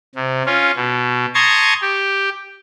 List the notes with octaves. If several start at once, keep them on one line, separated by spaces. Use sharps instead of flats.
C3
C#4 F4
B2
A5 A#5 C6 C#6 D#6 G#6
G4